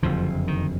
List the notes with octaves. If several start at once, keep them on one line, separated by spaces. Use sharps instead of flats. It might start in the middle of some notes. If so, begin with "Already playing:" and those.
F#1 F2 D3 F3
D#3